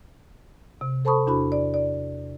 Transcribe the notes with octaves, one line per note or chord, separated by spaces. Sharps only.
C3
A4 C5 A5 B5 C#6 D#6
E2 D4 E4 F#4 B5
D5
D5